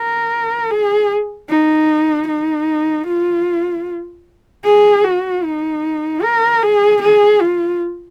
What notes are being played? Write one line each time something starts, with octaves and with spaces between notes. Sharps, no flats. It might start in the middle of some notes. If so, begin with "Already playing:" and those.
Already playing: A#4
G#4
D#4
D#4
F4
G#4
F#4
D#4
A#4
G#4
G#4
F4